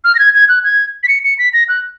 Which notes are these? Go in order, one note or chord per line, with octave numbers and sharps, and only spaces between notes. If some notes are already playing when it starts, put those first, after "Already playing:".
F6
A#6
G#6
G#6
F#6
G#6
B6
C#7
C#7
B6
A#6
F#6